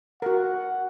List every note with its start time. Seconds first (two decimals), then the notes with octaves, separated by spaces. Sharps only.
0.22 F#4 A#4 F#5